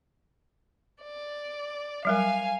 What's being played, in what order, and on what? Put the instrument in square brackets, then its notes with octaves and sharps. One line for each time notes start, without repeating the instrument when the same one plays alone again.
[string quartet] D5
[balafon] F#3 G3 A#4 [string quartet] F5 G#5